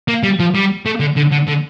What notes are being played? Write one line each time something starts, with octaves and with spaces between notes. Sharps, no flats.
A#3
G3
F3
G3
A3
D3
D3
D3
D3